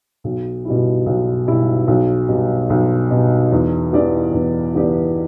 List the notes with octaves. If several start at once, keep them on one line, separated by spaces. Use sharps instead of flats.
B1
B2 G3 E4
B1
B2 G3 E4
B1
B2 G3
B1
B2 G3
E2
E3 B3 G4 D5
E2
E3 B3 G4 D5